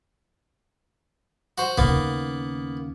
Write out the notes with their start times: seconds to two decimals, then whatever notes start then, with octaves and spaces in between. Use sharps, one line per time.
1.58 F#4 C5
1.78 D#2 C#3 A#3 B3